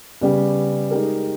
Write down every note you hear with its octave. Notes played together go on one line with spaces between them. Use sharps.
C#3 G3 B3 G4
G#3 D#4 G4 A#4